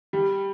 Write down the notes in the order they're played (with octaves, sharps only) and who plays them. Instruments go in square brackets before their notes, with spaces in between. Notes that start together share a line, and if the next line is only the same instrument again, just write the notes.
[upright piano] G3